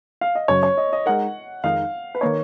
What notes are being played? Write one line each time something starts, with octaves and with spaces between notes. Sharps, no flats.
F5
D#5
F#2 C#3 F#3 C#5
C#5
D#5
D#5
G#3 D#4 A#4 F#5
F2 D#3 G#3 D#4 F5
B4
D#3 A#3 D#4 C#5